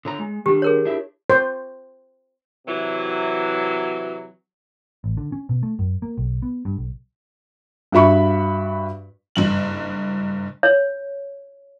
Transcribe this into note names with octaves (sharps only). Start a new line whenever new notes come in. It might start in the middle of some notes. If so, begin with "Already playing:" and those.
D3 C#5 A#5
G#3
D#3 D4 G4
G#4 A#4 C#5
D4 E4 E5
C5
C3 E3 F#3
A1
D3
C#4
B2
A3
F#2
A#3
B1
B3
G2
B1
G2 F#4 E5 B5 C#6
F#1 G2 F#7
C#5